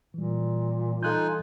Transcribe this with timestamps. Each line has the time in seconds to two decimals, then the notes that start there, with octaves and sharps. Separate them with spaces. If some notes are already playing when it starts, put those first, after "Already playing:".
0.14 A#2 E3 G3
1.03 D#4 F4 A4 G#5 F#6 G6